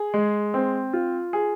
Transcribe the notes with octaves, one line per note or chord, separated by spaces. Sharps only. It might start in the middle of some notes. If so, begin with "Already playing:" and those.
Already playing: G#4
G#3
C4
F4
G#4